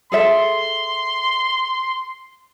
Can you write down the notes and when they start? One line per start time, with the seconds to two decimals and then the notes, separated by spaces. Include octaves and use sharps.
0.12 G#4 A4 E5 C6